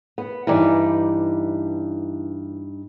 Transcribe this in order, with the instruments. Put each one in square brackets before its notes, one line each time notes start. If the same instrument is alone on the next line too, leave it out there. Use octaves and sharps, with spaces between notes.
[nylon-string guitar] B3
[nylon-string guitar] G2 D#4 D5 [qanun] E3 E4